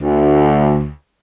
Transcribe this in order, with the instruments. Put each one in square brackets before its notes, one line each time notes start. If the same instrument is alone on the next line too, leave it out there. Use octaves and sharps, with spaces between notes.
[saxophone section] D2